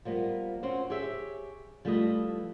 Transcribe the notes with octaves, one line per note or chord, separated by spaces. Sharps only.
F3 G3 A#3 B3
C4 C#4 F#4 C5
G4 G#4 C#5 E5
F3 G3 A3 E4 B4 D#5